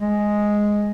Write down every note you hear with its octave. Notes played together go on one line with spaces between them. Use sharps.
G#3